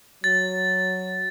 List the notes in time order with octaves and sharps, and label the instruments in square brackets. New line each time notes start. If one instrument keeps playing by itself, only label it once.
[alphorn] F#3 [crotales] A6